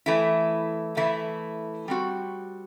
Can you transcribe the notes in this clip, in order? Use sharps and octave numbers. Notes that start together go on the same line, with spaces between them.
E3 A3 E4
E3 A3 E4
G3 C4 F#4